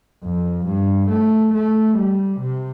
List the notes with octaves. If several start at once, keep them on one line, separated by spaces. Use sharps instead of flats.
F2
G2
A3
A3
G3
C3